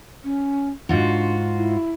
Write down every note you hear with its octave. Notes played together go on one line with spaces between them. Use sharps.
C#4
G#2 D4 F4 F#4
E4